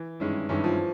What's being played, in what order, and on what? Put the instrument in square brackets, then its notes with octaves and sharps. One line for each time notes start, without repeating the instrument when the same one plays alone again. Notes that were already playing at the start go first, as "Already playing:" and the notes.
Already playing: [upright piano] E3
[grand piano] G2 D#3 G#3 C#4 E4
[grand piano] G2 D#3 G#3 C#4 E4 [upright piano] E3
[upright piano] F3